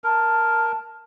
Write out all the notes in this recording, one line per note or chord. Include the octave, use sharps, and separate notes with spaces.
A#4 A5